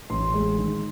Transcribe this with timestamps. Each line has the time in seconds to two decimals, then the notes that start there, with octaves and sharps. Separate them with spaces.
0.10 A1 C6
0.34 G#3
0.58 D#3